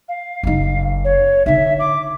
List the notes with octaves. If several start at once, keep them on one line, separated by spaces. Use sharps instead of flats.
F5
F#1 D#4
C#5
D3 D#4 E5
D6